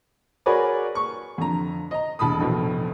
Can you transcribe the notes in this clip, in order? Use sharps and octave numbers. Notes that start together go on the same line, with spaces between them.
F#4 G#4 A#4 B4 C#5 D5
C#6
F2 D3 A#5
D#5 A#5
E1 A5 B5 D#6
F1 A#1 B2